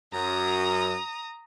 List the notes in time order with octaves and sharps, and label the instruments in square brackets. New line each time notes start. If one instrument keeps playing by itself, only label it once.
[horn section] F#2 [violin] A#5 D#6